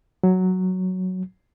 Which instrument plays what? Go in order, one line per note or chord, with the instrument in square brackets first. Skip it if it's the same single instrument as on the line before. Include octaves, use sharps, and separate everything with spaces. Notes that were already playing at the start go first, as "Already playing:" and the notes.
[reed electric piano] F#3